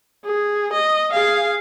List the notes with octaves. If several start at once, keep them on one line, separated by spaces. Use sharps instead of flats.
G#4
D#5
G#4 F5